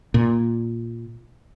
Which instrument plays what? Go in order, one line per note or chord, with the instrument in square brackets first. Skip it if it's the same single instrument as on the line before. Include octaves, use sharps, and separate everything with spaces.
[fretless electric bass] A#2